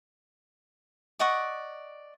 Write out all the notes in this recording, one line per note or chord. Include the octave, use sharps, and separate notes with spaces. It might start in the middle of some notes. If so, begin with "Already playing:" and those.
D5 D#5 F#5 C#6